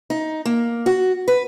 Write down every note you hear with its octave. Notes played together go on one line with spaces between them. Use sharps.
D#4
A#3
F#4
B4